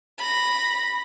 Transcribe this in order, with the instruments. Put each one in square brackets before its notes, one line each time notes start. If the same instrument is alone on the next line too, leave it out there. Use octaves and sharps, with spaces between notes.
[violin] B5 A#6